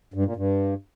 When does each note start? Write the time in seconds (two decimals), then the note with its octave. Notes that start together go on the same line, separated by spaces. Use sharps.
0.14 G2
0.25 A#2
0.36 G2